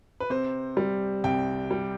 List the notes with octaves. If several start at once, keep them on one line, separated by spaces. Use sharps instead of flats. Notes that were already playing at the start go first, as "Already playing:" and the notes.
B4
C3 C5
G3
C2 G5
G3